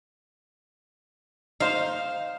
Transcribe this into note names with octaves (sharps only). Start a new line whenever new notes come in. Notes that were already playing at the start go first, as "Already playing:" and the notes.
D#4 C5 F5